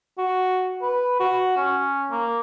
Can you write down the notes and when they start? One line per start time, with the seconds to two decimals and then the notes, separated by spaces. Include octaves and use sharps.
0.18 F#4
0.82 B4
1.20 F#4
1.57 C#4
2.11 A#3